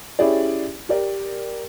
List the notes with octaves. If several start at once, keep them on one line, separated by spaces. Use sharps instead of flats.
C#4 E4 G4 G#4 D5
G4 A#4 D5